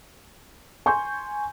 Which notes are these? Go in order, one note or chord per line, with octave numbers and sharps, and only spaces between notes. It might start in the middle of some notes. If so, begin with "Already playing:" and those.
G#5 C6 C#6 G6